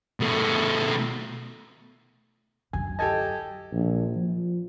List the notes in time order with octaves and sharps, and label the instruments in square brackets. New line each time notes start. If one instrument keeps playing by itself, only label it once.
[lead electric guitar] B2 A3
[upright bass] F#2 D3 [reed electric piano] G#5
[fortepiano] G4 A4 D#5 [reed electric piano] A5 G#6
[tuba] A#1
F3